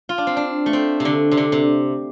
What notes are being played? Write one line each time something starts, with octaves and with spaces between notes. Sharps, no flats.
F4
D4
C4
D4
A3
C4
C3
D3
C3
D3
C3